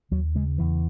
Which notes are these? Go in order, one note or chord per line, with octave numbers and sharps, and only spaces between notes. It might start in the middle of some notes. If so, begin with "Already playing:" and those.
D#2 F#3
C#3 G#3
E2 E3